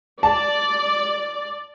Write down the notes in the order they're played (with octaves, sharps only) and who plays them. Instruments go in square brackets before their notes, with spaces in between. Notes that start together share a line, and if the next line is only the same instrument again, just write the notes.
[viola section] D5 [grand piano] A5